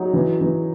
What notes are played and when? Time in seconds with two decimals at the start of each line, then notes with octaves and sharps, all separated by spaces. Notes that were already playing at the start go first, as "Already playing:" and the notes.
Already playing: F#3 D#4
0.13 E3
0.41 E3